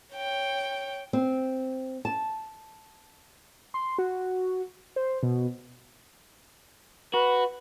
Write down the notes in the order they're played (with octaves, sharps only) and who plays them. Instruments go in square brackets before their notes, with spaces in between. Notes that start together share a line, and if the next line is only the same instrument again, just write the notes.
[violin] C#5 G5
[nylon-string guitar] C4
A5
[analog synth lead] C6
F#4
C5
B2
[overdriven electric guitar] F#4 [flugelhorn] B4